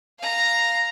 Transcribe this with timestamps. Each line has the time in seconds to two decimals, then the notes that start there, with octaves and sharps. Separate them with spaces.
0.19 F5 A#5